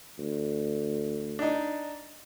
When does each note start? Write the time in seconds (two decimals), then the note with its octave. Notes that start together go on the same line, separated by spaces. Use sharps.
0.19 D2
1.39 D4 D#4